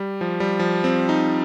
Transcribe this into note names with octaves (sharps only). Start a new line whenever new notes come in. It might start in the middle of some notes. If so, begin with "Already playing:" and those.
Already playing: G3
F3
G3
F3
C4
D#4